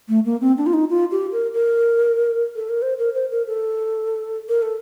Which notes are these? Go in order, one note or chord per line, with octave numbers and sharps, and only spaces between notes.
A3
A#3
C4
D4
F4
D#4
F4
G4
A#4
A#4
A4
A#4
C5
A#4
C5
A#4
A4
A#4
A4